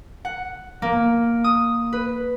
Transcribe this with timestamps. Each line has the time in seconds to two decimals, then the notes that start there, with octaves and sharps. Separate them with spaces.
0.25 F#5
0.82 A#3
1.44 D#6
1.93 B4